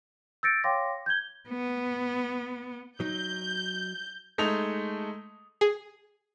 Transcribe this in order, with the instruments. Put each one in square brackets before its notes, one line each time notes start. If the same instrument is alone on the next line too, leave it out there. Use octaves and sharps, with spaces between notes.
[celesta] E6 G6 A6 A#6 C#7 D7
C#5 F5 G5 C6 D6 A#6
G6 G#6 G7
[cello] B3
[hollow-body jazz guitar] F#3 D#4 [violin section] G6
[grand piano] G#3 A3 D#4 D#6 F7
[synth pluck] G#4